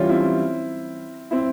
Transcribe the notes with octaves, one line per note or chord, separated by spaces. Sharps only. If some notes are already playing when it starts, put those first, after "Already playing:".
Already playing: E3 G3 C#4 F4
C4 E4
C4 E4